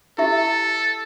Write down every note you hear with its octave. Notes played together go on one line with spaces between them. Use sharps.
E4 G4 A4 E5